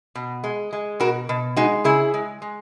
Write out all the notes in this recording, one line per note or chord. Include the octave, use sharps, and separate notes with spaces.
B2
G#3
G#3
B2 F#4 A#4
B2
G#3 D#4 F#4
C#3 E4 G#4
G#3
G#3